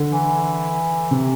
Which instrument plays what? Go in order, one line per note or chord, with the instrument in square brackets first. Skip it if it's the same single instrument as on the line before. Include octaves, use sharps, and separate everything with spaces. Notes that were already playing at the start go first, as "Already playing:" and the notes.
Already playing: [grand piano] D3
[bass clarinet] E3
[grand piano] C3